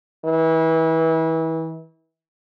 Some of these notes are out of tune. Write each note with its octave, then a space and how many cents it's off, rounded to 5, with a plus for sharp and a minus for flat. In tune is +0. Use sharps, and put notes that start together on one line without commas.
E3 -30